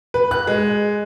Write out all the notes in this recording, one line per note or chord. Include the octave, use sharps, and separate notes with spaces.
B4
F#6
G#3